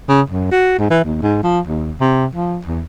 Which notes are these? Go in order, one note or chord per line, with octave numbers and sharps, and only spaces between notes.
C#3
F#2
F#4
G#2
E3
D#2
G#2
F3
D#2
C3
F3
E2